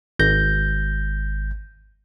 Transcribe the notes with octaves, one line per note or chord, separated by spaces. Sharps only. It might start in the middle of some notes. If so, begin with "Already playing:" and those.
G#1 G6 A#6